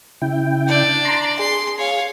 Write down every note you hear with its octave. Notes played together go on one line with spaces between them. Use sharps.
C#3 E4 G5
D4 D5
A#5 C6
G#4 C6
C#5 F5